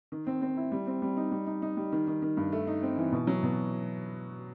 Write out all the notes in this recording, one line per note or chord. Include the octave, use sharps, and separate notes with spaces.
D#3
C4
C4
E4
G3
C4
G3
D#4
G3
D#4
D#4
G3
D#3
D#3
D#3
G2
A3
D#4
C4
E3
B2
F#3
B2